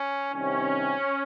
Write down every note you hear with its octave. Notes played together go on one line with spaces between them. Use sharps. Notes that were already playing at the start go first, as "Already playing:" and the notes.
Already playing: C#4
C2 C3 D#3 C#4